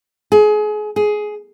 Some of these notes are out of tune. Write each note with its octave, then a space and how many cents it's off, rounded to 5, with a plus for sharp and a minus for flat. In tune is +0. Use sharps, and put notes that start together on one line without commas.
G#4 +30
G#4 +15